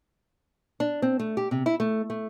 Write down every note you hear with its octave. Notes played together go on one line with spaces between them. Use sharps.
D4
C4
A3
G4
C3
E4
A3
A3